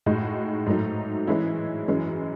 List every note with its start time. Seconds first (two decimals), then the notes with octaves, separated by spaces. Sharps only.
0.06 A2 G#3 D#4 F#4
0.66 G#2 F#3 A3 D#4
1.27 E3 G#3 C#4 E4
1.88 F#2 E3 G#3 C#4